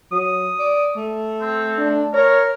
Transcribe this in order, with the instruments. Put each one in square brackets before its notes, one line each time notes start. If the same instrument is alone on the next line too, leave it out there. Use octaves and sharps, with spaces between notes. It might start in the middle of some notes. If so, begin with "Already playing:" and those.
[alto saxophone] F#3 [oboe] D#6
[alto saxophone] D5
A3
[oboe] C4
[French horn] D4
[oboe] A#4 [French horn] C#5